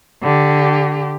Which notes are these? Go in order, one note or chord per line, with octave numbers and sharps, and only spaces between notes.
D3 G4